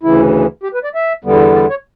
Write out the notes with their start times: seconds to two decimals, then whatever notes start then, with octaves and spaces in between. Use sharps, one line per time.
0.03 D2 C#3 E3 E4
0.63 G4
0.74 B4
0.84 D5
0.95 E5
1.24 E2 D3 G3 B3
1.55 D5
1.70 C#5